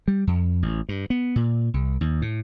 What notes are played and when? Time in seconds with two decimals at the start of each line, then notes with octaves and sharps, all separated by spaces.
0.08 G3
0.27 F2
0.62 A1
0.89 G2
1.10 B3
1.36 A#2
1.74 C2
2.01 D#2
2.22 A2